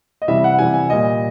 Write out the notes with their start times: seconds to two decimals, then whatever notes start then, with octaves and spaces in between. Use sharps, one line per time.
0.22 D#5
0.28 C3 E3 G3 E5
0.44 F#5
0.59 C3 E3 G3 G#5
0.74 G#5
0.89 A#2 G3 D#5